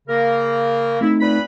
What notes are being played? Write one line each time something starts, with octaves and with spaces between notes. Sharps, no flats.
C#3 A#3 A#4
A3 C4 D#4 E4
A#2 B4 B5